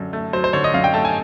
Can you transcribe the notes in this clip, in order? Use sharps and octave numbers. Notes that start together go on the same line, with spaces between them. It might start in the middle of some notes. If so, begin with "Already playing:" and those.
Already playing: F#2 D3
A3
F#3 C5
C5
D3 C#5
D#5
F#2 F5
G5
A3 A5
G#5